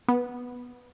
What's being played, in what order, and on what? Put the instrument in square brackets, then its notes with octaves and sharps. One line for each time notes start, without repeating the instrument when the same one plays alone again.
[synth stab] B3